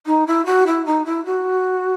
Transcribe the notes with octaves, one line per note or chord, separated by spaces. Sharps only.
D#4
E4
F#4
E4
D#4
E4
F#4